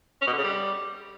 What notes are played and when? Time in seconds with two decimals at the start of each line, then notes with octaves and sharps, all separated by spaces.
0.21 C#4
0.27 B2
0.33 D3
0.38 C#3
0.44 G3